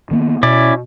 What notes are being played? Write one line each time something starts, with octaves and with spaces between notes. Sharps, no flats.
D#3 A#3 B3
B2 C#4 E4 D5